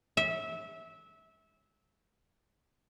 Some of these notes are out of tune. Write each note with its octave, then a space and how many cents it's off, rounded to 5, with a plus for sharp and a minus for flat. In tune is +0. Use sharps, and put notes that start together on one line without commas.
E5 -20